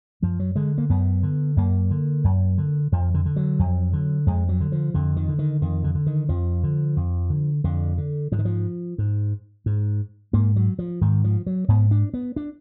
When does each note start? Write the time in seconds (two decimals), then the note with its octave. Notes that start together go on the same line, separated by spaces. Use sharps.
0.22 F#2 F3
0.40 F#3
0.56 D3 G#3
0.78 A#3
0.89 F#2 B3
1.23 D3
1.56 F#2 A#3
1.91 D3
2.24 F#2
2.58 D3
2.92 F2 F3
3.14 D3
3.26 D3
3.36 F#3
3.59 F2
3.93 D3
4.27 F2 G#3
4.49 F#3
4.61 D3
4.72 F3
4.94 F2 D3
5.16 D#3
5.29 D3
5.39 D#3
5.62 F2 D#3
5.84 D3
5.95 D3
6.06 D#3
6.29 F2 F3
6.63 D3
6.96 F2
7.30 D3
7.64 F2 D3
7.98 D3
8.32 G#2 F3
8.39 D#3
8.45 F3
8.98 G#2
9.66 G#2
10.33 G#2 A#3
10.56 F#3
10.79 F3
11.01 G#2 D#3
11.24 F3
11.46 F#3
11.68 G#2 B3
11.91 D4
12.14 B3
12.36 D4